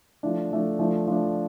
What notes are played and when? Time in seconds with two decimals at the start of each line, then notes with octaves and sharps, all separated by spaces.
0.23 F3 A3 D4
0.51 F3 A3 D4
0.79 F3 A3 D4
1.07 F3 A3 D4